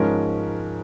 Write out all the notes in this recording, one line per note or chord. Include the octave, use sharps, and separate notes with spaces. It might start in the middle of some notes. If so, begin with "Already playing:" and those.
Already playing: G#2 F3 G#3 C#4 A#4